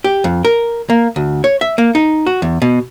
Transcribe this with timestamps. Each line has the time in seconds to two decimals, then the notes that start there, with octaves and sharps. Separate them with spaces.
0.04 G4
0.24 F2
0.45 A#4
0.90 A#3
1.16 D2
1.44 C#5
1.61 E5
1.78 A#3
1.95 D#4
2.26 F#4
2.42 E2
2.62 B2